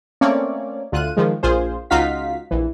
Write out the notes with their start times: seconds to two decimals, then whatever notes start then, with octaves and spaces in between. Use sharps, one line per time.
0.21 A3 A#3 C4 C#4 C#5 D5
0.92 D2 F4 F#6 D#7
1.17 D#3 F3 G#3
1.43 A#1 A#2 F4 G#4 C5
1.90 C#2 D#4 F4 F#4 F5 B6
2.51 A#1 E3